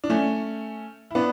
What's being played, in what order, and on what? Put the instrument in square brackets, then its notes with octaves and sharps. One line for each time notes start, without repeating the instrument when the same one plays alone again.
[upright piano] D4
A3 C#4
E4
B3 D4